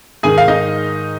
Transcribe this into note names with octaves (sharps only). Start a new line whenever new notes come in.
G#2 D#3 G#4 G#5
F5
D#4 D#5